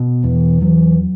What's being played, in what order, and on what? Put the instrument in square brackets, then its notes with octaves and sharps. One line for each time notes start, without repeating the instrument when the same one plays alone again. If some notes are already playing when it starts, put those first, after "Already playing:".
Already playing: [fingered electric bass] B2
[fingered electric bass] E2 [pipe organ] E3
[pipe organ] E3 [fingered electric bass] F#3